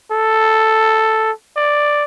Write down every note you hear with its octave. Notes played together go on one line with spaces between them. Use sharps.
A4
D5